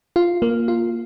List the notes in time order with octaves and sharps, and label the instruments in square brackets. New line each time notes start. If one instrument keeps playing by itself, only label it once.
[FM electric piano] F4
A#3
F4